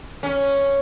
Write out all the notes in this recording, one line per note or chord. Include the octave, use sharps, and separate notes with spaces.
C#4